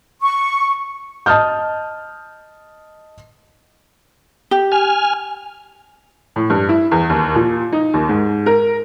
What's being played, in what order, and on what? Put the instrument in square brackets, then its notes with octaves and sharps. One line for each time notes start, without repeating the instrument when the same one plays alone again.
[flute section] C#6
[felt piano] D#5 A5 D#6 F6 G6
[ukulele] G4
[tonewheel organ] G#5 F6
[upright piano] A2
G2
E4
E2
D#2
A#2
D#4
D#2
G#2
A#4